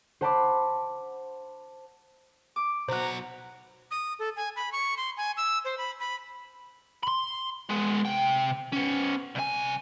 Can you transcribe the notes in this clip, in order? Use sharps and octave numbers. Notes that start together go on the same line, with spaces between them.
C5 F#5 A5 B5 C6 D6
D6
B1 F#4 C5 A#5 F#6
D#6
A4
G#5
B5
C#6
C6
G#5
E6
C5
B5
B5
B5 C6
G#3 B3
C3 G5
B3 C#4
C2 G#5